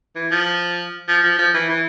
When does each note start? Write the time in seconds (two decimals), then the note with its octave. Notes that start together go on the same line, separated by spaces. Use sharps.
0.15 E3
0.31 F3
1.08 F3
1.24 F3
1.39 F3
1.54 E3
1.69 E3